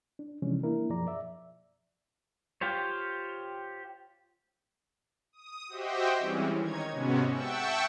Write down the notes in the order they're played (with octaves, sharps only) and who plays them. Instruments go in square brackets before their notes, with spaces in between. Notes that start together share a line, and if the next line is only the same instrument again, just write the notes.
[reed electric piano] D4
C3 E3 F3 G#3 C#4 D4
A#3 D4 E4 A#4
F#2 B2 F3 G#4 D5 A#5
D5 E5
[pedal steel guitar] F4 G4 C5 C#5
[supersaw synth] D#6
F#4 G4 C5 D#5 E5 G5
E3 G3 G#3 C4 C#4
D#3 D#4 C#5 G#6
G#2 C3 G#3 B3 C#4 F#4
E5 F#5 G5 A5 C#6 E6